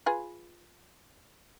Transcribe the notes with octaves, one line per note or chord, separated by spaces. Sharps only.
F4 G#4 B4